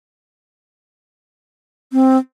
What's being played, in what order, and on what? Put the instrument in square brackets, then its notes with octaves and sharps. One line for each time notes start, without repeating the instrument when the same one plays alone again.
[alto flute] C4